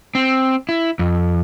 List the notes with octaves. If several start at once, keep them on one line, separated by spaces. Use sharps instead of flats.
C4
E4
F2